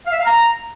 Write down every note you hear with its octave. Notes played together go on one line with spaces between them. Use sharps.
F5
E5
F5
A#5